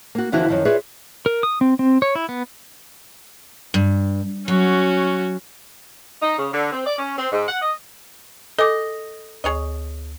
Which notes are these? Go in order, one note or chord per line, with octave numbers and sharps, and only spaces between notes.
A#3 F#4
D#2 D3 E3 F3 E4 F#4
F#2 D#3 F3
F4 G#4 B4 C#5 D5 E5
A#4
D#6
C4
C4
C#5
E4
B3
G2
F#3 C#4 F#4
D#4
C#3
D3
C4
D5
C#4
C4
G#2
F#5
D#5
A4 D#5 G#5 D6
D2 G#4 C#5 D#5